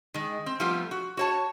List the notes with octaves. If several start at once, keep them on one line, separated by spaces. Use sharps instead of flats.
D#3 G#3
C4
F3 G3 A3 B3 F4 G4
F#4
F#4 C#5 A5